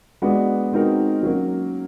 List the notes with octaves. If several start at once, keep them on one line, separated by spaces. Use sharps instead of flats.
G#3 B3 D4 F#4
G#3 C4 D#4 F#4 A#4
F#3 A#3 C#4